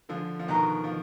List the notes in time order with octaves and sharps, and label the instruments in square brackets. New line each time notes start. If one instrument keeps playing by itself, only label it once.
[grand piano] D3 F3 [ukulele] G#4
[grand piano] F3
[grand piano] B2 D#3 [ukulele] B4 D#5 A#5
[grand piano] F3